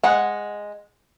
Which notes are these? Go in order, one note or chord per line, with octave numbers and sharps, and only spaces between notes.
G#3 F#5